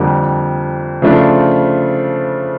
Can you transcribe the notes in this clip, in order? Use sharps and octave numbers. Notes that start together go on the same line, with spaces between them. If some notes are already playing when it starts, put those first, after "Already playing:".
Already playing: F2 D3 G3 A#3
C#3 F3 A3 D4 F4